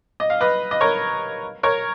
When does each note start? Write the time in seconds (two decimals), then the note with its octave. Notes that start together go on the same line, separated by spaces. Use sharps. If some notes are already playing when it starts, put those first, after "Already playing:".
0.20 D#5
0.30 F5
0.41 B4 D#5
0.71 D#5
0.81 A#4 C#5
1.63 A#4 C#5